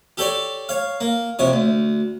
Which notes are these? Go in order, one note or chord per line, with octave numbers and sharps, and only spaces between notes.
G4 A4 C#5 D5
C#5 F5
A#3
F2 C3 C#5
D2